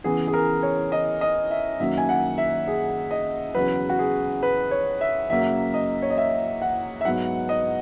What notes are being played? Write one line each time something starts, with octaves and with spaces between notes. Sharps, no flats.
C#3 E3 B3 G#4
G#4
A#4
C#5
D#5
D#5
E5
F#2 D#3 F#3 A#3 E5
G#5
F#5
E5
G#4
D#5
E2 C#3 F#3 B4
F#4
G#4
B4
C#5
E5
F#2 C#3 F#3 A#3 E5
D#5
C#5
D#5
E5
F#5
E5
G#2 F#3 B3 F#5
D#5